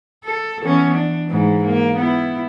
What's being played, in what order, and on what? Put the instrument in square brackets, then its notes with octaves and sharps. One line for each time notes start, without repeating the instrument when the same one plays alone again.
[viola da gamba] A4
E3 B3 C#4
D4
G#2 E3
A#3
B3 E4